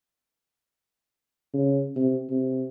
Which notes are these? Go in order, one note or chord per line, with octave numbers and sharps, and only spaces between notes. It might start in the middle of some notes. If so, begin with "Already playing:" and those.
C#3
C3
C3